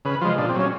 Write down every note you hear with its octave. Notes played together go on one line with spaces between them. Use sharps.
C#3 B4
F3 G#3 F4
A#2 D4
C4
F#3
C#4